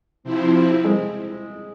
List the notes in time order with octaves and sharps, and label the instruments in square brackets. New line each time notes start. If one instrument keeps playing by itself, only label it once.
[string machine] C3 F3 C4 E4
[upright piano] G#3